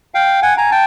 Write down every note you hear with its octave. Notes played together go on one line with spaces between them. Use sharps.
F5 G5
F#5 G#5
G#5 A#5
G5 A5